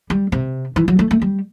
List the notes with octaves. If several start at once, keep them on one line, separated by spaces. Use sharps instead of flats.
G3
C3
E3
F#3
A3
A3
G3